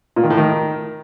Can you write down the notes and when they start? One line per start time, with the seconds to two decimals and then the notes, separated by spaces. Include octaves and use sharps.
0.16 A#2
0.23 D#3
0.30 A2
0.37 D#3